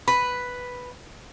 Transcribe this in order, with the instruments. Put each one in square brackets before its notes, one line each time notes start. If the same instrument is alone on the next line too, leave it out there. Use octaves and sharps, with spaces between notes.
[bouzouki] B4